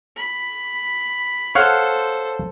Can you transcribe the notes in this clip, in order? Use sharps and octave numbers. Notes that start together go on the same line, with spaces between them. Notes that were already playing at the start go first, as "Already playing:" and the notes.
B5
A4 C5 C#5 F5 F#5